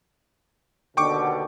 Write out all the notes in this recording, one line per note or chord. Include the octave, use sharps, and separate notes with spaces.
D#2 B2 D3 G5 C#6 D6